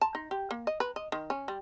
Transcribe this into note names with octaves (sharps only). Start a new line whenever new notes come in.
A5
D#4
G4
A#3
D#5
B4
D#5
D#3
C#4
G3